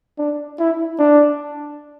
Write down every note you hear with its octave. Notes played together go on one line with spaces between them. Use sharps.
D4
E4
D4